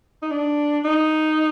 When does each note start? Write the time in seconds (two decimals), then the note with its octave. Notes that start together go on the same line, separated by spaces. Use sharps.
0.22 D#4
0.31 D4
0.85 D#4